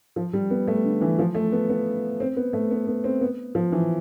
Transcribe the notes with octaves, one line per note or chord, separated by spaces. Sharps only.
F3
G3
B3
A3
D3
E3
F3
A3
B3
B3
C4
B3
A3
B3
B3
C4
B3
F3
E3